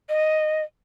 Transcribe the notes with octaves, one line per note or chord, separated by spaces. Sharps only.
D#5